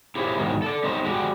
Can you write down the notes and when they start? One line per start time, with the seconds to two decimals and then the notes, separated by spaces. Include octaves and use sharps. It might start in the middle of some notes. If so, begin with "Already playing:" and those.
0.15 E4 G4 G#4 C5 C#5 E5
0.37 E2 G#2 D#3 F#3
0.62 A4 D5
0.83 B3 D#4 G4 C5 C#5
1.04 G#3 F#4 G4 D5